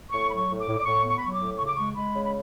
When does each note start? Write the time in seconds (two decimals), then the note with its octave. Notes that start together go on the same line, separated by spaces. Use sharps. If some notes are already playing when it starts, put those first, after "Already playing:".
0.11 A2 C#6
0.29 F#3 B5
0.36 C#6
0.48 A2
0.60 D6
0.67 A2
0.78 D6
0.85 A2 C#6
1.03 B3
1.10 C#6
1.16 B5
1.21 F#3 C#6
1.34 D6
1.40 A2
1.58 C#3 C#6
1.67 D6
1.75 G#3 C#6
1.95 G#3 B5
2.14 C#3
2.25 B5